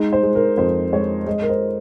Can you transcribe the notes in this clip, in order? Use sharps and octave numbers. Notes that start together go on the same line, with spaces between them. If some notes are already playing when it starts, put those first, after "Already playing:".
Already playing: G#3 D#4
C5
G#3
A#4
F2 C5
G#3 C#5
G#3 D#5
A#4
C5